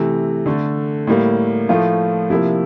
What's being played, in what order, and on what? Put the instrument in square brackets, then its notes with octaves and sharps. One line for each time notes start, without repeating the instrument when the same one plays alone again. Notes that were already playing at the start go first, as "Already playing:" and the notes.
Already playing: [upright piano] C3 E3 A3
D3 A3
A2 G3 A#3
A2 F3 A3 F4
C3 F3 A#3 E4